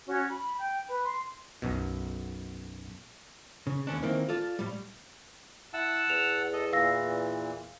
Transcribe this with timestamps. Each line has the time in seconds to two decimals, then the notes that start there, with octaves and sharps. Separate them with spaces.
0.05 C#4 F#4 C#5
0.28 B5
0.57 G5 G6
0.86 B4
1.04 C6
1.62 B1 F#2 B2
3.67 C#3
3.87 D#2 D3 C#4 D4
4.03 D#3 E3 A#3 C4
4.29 F4 A4 D5
4.59 A2 G3
5.73 E4 F#5 A5 E6
6.10 E2 F7
6.53 A4 D#5
6.73 A#2 E3 F5 E6 A#6